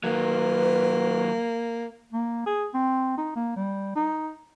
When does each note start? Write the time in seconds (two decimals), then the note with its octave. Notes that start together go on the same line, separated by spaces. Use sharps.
0.04 D#3 F#3 A#3 B4
2.13 A#3
2.46 G#4
2.74 C4
3.18 D#4
3.36 A#3
3.56 G3
3.96 D#4